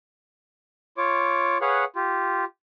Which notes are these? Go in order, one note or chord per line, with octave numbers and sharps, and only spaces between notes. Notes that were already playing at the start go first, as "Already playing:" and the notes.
F4 C#5 D6
G#4 B4 C#5 F5 F#5
F4 G4